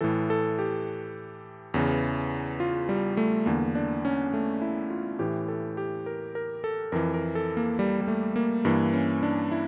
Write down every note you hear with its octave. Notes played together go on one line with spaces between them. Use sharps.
A2 E3 A4
A4
G4
E2 C#3 E3
F4
G3
A3
E2 D3 A#3
D4
C#4
A3
E4
F4
A2 E3 G4
A4
G4
A#4
A#4
A4
F2 E3 A#4
A#4
A4
A#3
G3
G3
A3
A#3
G2 E3 A#3
C#4
D4
E4